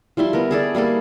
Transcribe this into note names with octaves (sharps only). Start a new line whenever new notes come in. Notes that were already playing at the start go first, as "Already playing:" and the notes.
F3 G3 E4 C6
B3 A#4
G#4 A4 D5
G3 A#3 G#4 A4